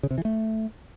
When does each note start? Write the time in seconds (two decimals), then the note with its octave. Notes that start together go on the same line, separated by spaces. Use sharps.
0.03 C#3
0.11 C3
0.18 E3
0.25 A3